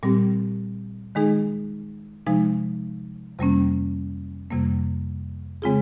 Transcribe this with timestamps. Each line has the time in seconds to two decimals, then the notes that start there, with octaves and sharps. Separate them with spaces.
0.03 A#2 G3 C4 G4
1.15 D#3 G#3 D#4 G#4
2.26 C3 F3 G#3 D#4
3.39 F2 C3 G3 A#3 C#4
4.51 F2 C3 G3 A#3
5.62 C#3 G#3 C4 F4 G#4